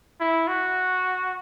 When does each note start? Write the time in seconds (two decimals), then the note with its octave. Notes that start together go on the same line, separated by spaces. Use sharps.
0.20 E4
0.48 F#4